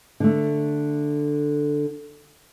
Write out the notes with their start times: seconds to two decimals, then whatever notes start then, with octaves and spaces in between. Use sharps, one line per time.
0.20 D3 A3